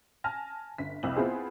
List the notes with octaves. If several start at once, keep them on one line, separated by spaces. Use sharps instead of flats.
G#5 A5 F6 A#6
G1 B6
C2 F2 E4 E6 F#7
B3 C4 E4 F4 G#4 C5